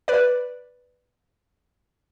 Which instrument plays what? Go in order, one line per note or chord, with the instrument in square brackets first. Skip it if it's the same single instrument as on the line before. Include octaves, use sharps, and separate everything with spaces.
[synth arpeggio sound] B4 D5